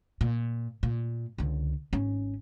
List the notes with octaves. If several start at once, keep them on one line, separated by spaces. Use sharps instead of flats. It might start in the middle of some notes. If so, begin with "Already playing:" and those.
A#2
A#2
C#2 D3
G#1 C#4